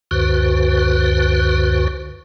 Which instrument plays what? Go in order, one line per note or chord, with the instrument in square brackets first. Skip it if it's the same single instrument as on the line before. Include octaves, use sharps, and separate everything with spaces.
[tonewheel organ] C#2 F#2 D3 F#4 B4 C5